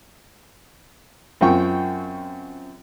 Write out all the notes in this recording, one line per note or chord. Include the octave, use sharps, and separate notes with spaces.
F#2 C4 F4 G5 C#6